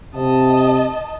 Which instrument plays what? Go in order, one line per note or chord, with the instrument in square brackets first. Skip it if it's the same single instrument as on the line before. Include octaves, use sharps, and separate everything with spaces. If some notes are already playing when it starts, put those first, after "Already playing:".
[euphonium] C3 [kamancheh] D#5 A5